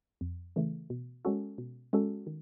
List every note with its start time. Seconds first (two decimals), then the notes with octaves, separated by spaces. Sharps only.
0.21 F2
0.56 C#3 E3 A3
0.90 B2
1.25 G#3 C#4 F#4 A4
1.58 B2
1.93 G#3 C#4 F#4 A4
2.27 D#3